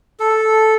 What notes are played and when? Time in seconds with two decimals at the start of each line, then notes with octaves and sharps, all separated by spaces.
0.20 A4